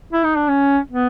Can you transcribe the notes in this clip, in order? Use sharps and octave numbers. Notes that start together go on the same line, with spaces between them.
E4
D#4
D4
C#4
B3